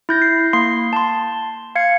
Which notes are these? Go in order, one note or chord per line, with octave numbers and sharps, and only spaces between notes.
E4 G6 A#6
C7
A#3 C6 C7
A5 C6
F5 G#6 C#7